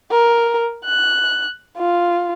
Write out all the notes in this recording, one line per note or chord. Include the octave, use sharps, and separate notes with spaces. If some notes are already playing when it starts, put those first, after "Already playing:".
A#4
F#6
F4